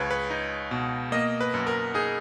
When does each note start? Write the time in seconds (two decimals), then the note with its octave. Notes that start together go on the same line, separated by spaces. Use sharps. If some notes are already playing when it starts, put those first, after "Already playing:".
Already playing: C#2 G#3 B4 C#5
0.11 B4
0.30 D#4
0.71 B2
1.12 A#3 D#5
1.41 B4
1.54 F#2
1.67 A#4
1.94 D#4 G#4